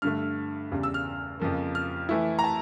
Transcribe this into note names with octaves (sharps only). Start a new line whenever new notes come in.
G2 D3 A3 F6
E2 C#3 G3
E6
F6
F2 C#3 F3 A#3
F6
E3 A3 E4
A#5
A5